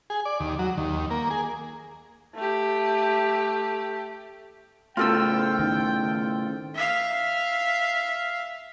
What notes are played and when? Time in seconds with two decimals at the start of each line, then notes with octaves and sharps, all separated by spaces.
0.10 G#4
0.25 D5
0.40 D#2
0.59 F#3
0.77 D#2
1.11 A#3
1.30 G#4
2.35 A3 G4
4.97 A2 C#3 F4 A4 G5 E6
5.60 D#3
6.75 E5 F5